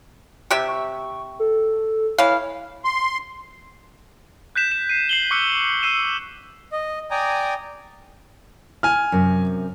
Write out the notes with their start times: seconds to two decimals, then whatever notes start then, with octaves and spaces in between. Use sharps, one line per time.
0.51 C3 G4 E5
0.68 C#6
1.39 A4
2.18 E3 C#5 F5
2.84 C6
4.56 F#6 G6 B6 E7
4.72 E7
4.89 C7 D#7
5.09 C7 F#7 G7
5.31 C#6 D6 E6 F#6 C#7
5.83 E6 C7 D#7 E7
6.72 D#5
7.11 D5 G5 G#5 A#5 D#6
8.83 G#5 F6
9.12 F#2 C3